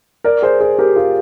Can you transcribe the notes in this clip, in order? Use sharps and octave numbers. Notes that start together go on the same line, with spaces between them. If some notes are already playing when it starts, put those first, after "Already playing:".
A#4 D5
G#4 C5
G#4 C5
G4 A#4
F4 G#4